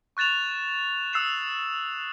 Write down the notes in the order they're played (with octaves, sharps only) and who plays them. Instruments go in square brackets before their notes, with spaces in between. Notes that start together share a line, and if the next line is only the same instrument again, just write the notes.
[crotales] C#6 F#6 A6 E7 F7
D#6 E6 F#6 C7 E7 F7